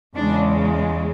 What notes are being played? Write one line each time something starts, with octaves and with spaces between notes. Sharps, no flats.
E2 C#3 G#3 D4